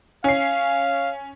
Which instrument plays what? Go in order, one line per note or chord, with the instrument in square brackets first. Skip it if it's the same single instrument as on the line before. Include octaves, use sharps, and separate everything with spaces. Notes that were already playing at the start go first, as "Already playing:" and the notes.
[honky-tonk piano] C#4 C7 [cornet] F5